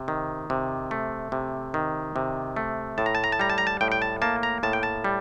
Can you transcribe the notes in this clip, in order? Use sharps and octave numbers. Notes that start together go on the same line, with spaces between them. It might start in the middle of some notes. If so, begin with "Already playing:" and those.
Already playing: C3
D#3
C3
A3
C3
D#3
C3
A3
A2 A5
A#5
A5
A#5
A5
G3 A#5
A5
A#5
A5
A2 G5
G5
A5
A#3 A5
A#5
A2 A5
G5
A5
G3